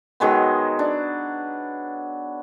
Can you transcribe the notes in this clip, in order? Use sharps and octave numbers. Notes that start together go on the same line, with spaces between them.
D#3 F#3 G#3 B3
D4